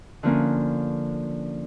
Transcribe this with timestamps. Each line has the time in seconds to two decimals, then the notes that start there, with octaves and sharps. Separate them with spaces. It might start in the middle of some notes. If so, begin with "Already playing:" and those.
0.23 D3 F3 A#3 C#4